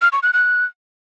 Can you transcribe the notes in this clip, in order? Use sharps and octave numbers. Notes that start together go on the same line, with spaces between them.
F6
C#6
F#6
F#6